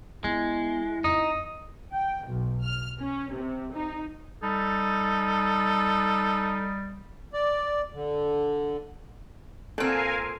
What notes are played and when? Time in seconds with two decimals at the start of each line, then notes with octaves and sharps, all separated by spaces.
0.24 G#3 B3 E4
1.04 F2 D#4 D#5
1.95 G5
2.27 B1
2.64 F6
3.00 C#4
3.34 C3
3.75 D#4
4.43 G3 D#4 A4
7.33 D5
7.94 D3
9.78 A#2 C4 A4 A#4 F5 G#5